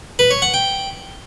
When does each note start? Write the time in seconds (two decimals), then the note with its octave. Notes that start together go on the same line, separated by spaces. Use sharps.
0.19 B4
0.31 C#5
0.42 F#5
0.54 G5